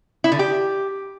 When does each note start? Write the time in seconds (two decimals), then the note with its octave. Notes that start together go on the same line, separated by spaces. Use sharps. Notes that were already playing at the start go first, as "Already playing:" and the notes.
0.24 E4
0.32 D3
0.39 G4